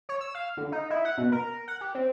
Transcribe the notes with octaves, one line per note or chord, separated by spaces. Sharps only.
C#5
E6
F5
D3
D#4
E4
F#5
B2
A#4
F#5
G4
C4